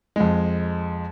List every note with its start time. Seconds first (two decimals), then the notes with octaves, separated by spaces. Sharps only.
0.16 F2 G#3